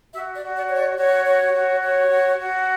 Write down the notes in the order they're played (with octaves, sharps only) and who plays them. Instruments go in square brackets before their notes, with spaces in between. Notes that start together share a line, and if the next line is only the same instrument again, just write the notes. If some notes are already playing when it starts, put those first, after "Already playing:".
[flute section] F#4 E5
D5
F#4
D5
C#5
D5
F#4 C#5
C#5
F#4
C#5
F#4
F#4